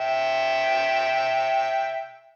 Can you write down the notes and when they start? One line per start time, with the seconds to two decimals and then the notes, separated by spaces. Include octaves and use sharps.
0.01 E5 G5